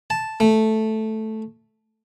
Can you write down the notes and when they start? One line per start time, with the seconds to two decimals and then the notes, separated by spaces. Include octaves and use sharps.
0.10 A5
0.40 A3